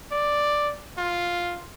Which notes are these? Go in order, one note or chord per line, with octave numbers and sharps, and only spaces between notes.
D5
F4